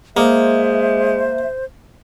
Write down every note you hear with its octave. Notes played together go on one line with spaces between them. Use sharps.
G#3 A#3 C5 E5